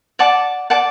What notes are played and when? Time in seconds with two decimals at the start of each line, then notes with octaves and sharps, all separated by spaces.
0.19 D5 F#5 A5 D6
0.70 D5 F#5 A5 D6